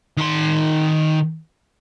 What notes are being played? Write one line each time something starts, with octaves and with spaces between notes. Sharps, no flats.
D#3 C6